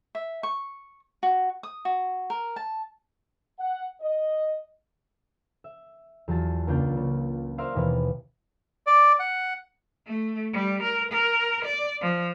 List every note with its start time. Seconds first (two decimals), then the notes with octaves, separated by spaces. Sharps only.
0.15 E5
0.43 C#6
1.23 F#4
1.63 D#6
1.85 F#4
2.30 A#4
2.56 A5
3.59 F#5
4.01 D#5
5.64 E5
6.28 E2 F#3 F4 F#4 A5 A6
6.67 C#2 A#3 D4 F4 G6
6.96 C#3
7.58 A#4 C5 D5 E5 F5 C6
7.75 D#2 B2 E3 B4 F5
8.87 D5
9.20 F#5
10.07 A3
10.53 G3
10.82 A#4
11.12 A#4
11.65 D5
12.01 F3